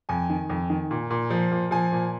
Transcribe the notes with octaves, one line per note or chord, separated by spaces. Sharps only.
F2 G#5
D#3
F2
D#3
A#2
A#2
F3
A#2
F3 G#5
A#2